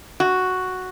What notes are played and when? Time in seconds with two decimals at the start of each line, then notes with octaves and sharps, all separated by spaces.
0.20 F#4